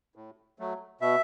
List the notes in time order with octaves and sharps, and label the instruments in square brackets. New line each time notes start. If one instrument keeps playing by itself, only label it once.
[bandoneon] A2
F#3 A3
B2 E5